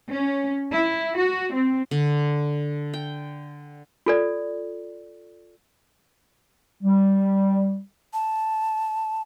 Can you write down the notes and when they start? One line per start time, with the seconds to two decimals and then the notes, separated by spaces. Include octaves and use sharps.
0.12 C#4
0.71 E4
1.16 F#4
1.53 C4
1.91 D3
2.94 G5
4.06 F4 A4 D5
6.83 G3
8.13 A5